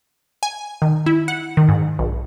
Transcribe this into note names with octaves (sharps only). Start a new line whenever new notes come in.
G#5
D#3
E4
F#5
D#3
G#2
B1